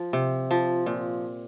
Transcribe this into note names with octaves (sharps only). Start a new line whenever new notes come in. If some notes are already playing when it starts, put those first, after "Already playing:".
Already playing: F3
C3
F3
A#2